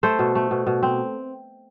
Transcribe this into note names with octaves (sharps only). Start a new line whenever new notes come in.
A3 A4 C5
B2
A3
B2
B2
C4